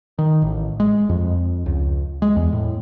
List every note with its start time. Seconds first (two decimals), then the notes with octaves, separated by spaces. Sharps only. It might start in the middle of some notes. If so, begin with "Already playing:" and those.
0.18 D#3
0.42 A1
0.80 G#3
1.09 F2
1.66 C#2
2.22 G#3
2.36 E2
2.53 A2